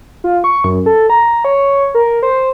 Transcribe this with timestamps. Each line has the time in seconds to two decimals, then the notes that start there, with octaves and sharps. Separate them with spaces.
0.24 F4
0.44 C#6
0.64 F#2
0.86 A4
1.10 A#5
1.45 C#5
1.95 A#4
2.23 C5